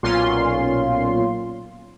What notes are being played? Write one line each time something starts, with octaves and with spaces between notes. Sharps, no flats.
B1 A#2 C#4 F4 C6